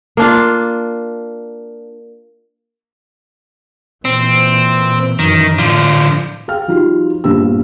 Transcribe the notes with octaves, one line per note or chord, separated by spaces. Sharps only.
A#3 D4 F4
A#2 E3 C4
F#2 D#3 E3
A2 D3 F3
G#4 F5 G5 F6
F3 G3 D#4 F4 F#4
A#1 G2 A#2 B3 E6